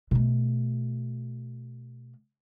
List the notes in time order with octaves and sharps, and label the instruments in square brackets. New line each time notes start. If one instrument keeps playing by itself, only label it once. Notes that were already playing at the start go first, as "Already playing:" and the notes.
[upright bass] B2 A3